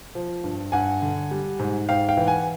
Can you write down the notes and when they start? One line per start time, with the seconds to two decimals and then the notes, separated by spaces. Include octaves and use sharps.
0.15 F3
0.44 G2
0.72 G2 F#5 G#5
1.02 D3
1.31 G3
1.59 G#2
1.89 G#2 F5 G5
2.08 F5 G5
2.17 E3
2.27 F#5 G#5